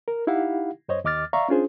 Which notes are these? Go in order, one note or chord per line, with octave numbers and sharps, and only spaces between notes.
A#4
D#4 E4 G4 F5 F#5
F#2 C5 C#5 D#5
D#2 D#5 D6 F6 A6
D5 E5 F5 A#5 C#6
C#4 D4 F4 G#4 C5